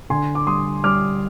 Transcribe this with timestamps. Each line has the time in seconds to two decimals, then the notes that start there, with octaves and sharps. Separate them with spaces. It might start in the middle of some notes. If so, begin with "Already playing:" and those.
0.10 D3 G#5 C6
0.35 D6
0.47 G3 C6 D#6
0.84 G3 D6 F6